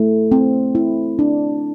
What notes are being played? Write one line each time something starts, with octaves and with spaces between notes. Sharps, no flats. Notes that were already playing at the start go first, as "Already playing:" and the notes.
Already playing: A3 E4
C4
E4
D4